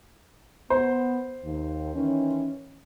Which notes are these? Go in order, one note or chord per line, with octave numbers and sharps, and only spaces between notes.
B3 C5
D#2
D#3 E3 C#4